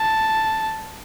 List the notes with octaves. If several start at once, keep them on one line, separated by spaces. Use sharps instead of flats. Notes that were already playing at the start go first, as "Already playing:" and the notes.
Already playing: A5